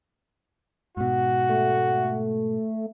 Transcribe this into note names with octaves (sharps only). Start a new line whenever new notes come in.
G#2 B2 F#4
A3